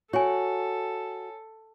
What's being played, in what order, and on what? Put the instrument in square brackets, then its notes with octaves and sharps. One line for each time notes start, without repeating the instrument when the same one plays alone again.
[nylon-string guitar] F#4 [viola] A4 [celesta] C#5 G#5